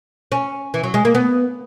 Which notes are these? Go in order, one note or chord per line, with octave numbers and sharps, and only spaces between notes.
C#4
E3
F#3
G#3
A#3
B3